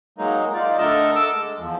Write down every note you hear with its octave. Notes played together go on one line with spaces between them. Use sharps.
F#3 G#3 A#3 D#4
D#4 F4 D5
D3 A3 A4 A#4 D#5 A5
A4 D6 E6
G#3
E2 F3